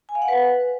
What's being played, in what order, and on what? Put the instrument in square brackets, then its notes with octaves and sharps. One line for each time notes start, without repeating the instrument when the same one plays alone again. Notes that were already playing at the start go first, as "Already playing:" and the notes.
[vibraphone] G#5
F5
F#5
B4